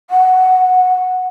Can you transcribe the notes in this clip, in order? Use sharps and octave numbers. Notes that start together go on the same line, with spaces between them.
F#5